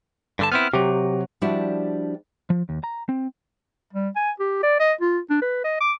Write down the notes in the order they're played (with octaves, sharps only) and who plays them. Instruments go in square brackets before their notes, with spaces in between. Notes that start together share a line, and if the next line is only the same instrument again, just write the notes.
[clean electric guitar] G2 D3 A5
[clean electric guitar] B3 C4 E4 [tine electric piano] F6
[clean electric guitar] C3 F#3 [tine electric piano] G4
[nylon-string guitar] F3 G3 D4 E4 F#4 G4
[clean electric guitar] F3
D#2
A#5
C4
[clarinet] G3
G#5
G4
D5
D#5
F4
D4
B4
D#5
D6